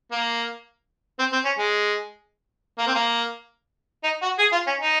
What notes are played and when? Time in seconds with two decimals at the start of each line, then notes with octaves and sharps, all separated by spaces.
0.11 A#3
1.19 C4
1.32 C4
1.45 C#4
1.58 G#3
2.78 A#3
2.87 C4
2.94 A#3
4.03 D#4
4.22 F#4
4.39 G#4
4.52 F4
4.67 C#4
4.80 D#4